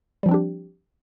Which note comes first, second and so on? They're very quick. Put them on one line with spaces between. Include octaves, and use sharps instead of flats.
G3 F3 C4 D4 G4